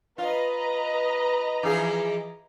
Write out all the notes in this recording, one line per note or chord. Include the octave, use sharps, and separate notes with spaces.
F4 B4 D#5 A#5
E3 F3 G#4